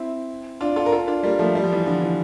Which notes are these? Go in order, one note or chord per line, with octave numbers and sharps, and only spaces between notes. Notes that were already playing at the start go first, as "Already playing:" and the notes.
Already playing: C4 E4
D4 F4
F4 A4
A#4
F4 A4
D4 F4
G3 A#3
F3 A3
G3
F3
E3 G3
D3 F3
E3